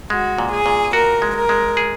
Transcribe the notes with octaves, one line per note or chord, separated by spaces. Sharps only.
G#3 F#4
A#2
G#4
A#2
F#4 A#4
G#3
A#4
G#3
G#4